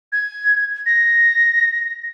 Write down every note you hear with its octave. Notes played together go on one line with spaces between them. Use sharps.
G#6
A#6